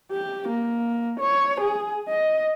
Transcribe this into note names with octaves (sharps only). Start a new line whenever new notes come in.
G4
A#3
C#5
G#4
D#5